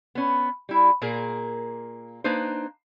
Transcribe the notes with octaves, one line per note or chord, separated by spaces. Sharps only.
B3 C#4
G3 E4
A#2 A#3 G#4 A#4 A#5
A#3 D4 D#4 B4 C5